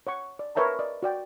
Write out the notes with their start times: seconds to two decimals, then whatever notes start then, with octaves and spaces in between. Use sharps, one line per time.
0.07 C#5 F#5 C#6
0.39 D5
0.55 A#4 B4 C#5 E5 A5 A#5
0.79 D5 D#5
1.03 F#4 D5 G5